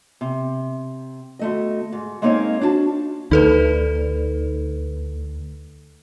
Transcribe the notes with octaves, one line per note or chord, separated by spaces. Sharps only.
C3
D2 A3 D#5
G#2
G#3 A#3 C4 D#4 C#5 F5
D4 E4 F#4 A5
D2 D#4 A4 B4